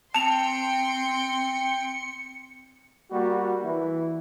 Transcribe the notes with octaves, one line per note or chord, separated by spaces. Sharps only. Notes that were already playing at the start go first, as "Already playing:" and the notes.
C4 G5 A5 C6 C#7 F7
G3 A#3 F#4
E3 E4